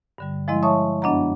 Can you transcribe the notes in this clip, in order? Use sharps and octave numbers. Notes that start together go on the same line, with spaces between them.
G2 D3 G3
F3 G#3 E4 D#5 C6
C#5 E5 A5 C#6 D#6
F#2 B3 D4 D#5 F#5 A#5